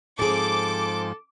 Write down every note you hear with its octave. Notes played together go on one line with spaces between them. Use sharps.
G#2 F3 C4 G#4 A4 D6